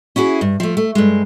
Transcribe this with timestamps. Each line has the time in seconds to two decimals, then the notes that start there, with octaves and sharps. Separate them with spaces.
0.16 C#4 E4 F#4 G#4
0.41 G2
0.60 F3 A3
0.77 A3
0.95 G2 G#3